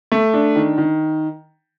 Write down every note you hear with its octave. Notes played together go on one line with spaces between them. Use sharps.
A3
D4
D#3
D#3